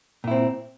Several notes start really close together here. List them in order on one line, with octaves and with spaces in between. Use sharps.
A#2 E4 C4